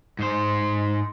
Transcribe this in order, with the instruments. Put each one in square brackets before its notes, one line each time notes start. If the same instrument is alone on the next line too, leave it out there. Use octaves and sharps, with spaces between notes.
[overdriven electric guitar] G#2 C5